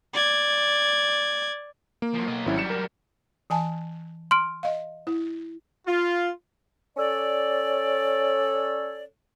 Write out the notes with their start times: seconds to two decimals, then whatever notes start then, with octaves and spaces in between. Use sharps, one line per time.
0.13 D5 G#6
2.02 A#3
2.14 F3 F#3
2.28 B1 D#5
2.46 G#1 F#3 G3 C#4 E4
2.58 C#7 E7
2.70 A#4
3.50 E3 G#5 A5
4.31 C6 F6 D7
4.63 D#5 F5
5.07 E4
5.87 F4
6.97 C#4 A4 C#5 D5